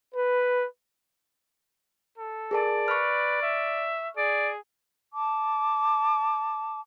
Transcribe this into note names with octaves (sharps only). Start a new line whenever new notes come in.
B4
A4
G#4 A#4 D5 A5
B4 C#6 F6
E5
G#4 D5
A5 D6